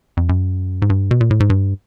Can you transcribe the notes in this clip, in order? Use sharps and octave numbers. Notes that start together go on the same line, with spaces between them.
F2
F#2
G#2
G2
B2
A#2
A2
G#2
G2